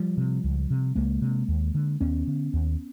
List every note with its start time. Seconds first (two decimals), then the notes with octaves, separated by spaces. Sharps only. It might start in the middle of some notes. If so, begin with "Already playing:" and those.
Already playing: F3 G3
0.17 C3
0.44 C#2
0.70 C3
0.95 C#2 G#3 A#3
1.22 C3
1.48 D#2
1.75 D3
2.01 D#2 B3 C#4
2.27 D3
2.54 D#2